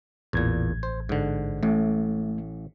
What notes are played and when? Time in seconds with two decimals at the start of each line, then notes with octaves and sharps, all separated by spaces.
0.33 A1 E2 A#2 G#6
0.83 C5
1.09 G#2 D3
1.63 A1 A2 A3